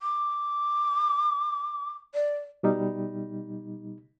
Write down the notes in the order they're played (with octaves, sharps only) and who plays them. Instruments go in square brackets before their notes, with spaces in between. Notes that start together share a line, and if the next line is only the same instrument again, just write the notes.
[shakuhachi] D6
D5
[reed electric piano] B2 G3 D#4